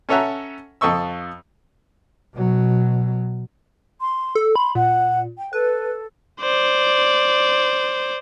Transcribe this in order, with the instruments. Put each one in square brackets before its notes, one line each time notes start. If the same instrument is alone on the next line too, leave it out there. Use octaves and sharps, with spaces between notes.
[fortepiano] C#4 A4 C#5 E5 F#5 A#5
F2 A4 D#5 C#6 E6
[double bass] B2 F#3
[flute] C6
[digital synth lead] A4
[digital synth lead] B5 [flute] C6
[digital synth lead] A#2 [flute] F#5
[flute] G5
[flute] A4 [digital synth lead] B4
[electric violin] C5 D5